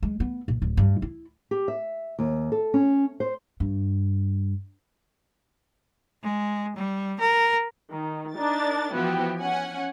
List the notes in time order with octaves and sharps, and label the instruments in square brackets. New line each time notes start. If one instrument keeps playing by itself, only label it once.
[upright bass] G#3
B3
A#1
D1
G2
E4
[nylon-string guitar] G4
E5
D#2
A4
C#4
C5
[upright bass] G2
[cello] G#3
G3
A#4
[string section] D#3
D4 D#4 A#4 A6
E3 F3 B3 E4 F#4 G4
C#4 F#5 G#5